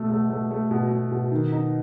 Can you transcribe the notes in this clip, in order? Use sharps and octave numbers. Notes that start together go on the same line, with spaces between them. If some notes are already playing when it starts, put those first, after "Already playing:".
Already playing: B2 A3
A3
A3
A3
B2
B2
B2
D#3
D#4